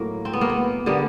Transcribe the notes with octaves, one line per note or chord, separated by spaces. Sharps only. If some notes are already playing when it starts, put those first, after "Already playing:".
Already playing: A2 F#3 A#3
C4
B3
A#3
B3
D3 G3 A#3 B3